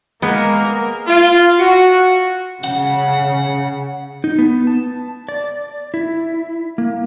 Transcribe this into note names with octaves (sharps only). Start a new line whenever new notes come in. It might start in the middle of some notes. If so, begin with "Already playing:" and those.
G#3 A#3 B3 A#4
F4
F#4
C#3 F#5
D#4
B3
A5
D5
E4
A#3